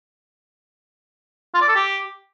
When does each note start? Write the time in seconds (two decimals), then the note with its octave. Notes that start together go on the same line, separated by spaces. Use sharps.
1.54 F4
1.61 D5
1.68 A4
1.76 G4